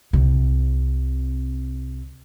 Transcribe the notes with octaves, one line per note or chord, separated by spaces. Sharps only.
C2 C3